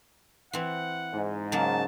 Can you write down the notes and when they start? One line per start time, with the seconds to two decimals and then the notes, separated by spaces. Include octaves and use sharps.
0.53 E3 C4 F#5
1.14 G#2
1.52 C#3 F#3 A#3 A5